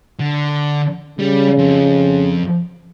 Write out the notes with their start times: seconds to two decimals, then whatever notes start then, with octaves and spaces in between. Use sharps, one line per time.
0.20 D3
1.19 C#3 G3
1.58 F2